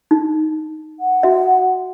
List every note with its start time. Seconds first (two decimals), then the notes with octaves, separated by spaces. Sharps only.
0.11 D#4
1.00 F#5
1.23 F#4 E5